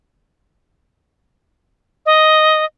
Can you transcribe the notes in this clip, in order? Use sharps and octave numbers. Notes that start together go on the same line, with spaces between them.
D#5